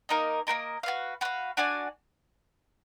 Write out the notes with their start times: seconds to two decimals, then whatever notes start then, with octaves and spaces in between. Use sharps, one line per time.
0.09 A#3 D#4 A#4 D#5
0.47 A#3 D#4 A#4 D#5
0.83 F#4 B4 F5
1.21 F#4 B4 F5
1.57 D4 F#4 D5 G#5